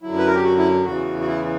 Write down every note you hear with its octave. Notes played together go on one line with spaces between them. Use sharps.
F#2 D3 F#3 E4
B4
A#4
G4
F#4
E4
E2 C#3 E3 F#4
F#4
E4